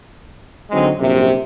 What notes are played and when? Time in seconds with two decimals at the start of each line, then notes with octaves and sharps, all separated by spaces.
0.70 D3 F#3 G#3 C4 D#4
0.99 A#1 F#2 C3